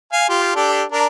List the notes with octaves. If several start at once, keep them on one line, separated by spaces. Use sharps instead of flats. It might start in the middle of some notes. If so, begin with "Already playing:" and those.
F5 G#5
F4 G4
D4 G4 A4
D4 A#4